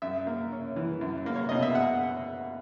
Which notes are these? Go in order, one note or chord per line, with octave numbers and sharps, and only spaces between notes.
F#2 E5
A#3
C#4
E3
F#2
A#3
C#5
B2 D#5
E5
F#5